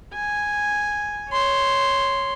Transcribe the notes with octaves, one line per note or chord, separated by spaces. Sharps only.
G#5
C#5 C6